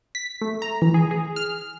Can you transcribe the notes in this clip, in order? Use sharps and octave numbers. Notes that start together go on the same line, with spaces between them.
B6
A3
A#5
E3
G#4
G#4
F6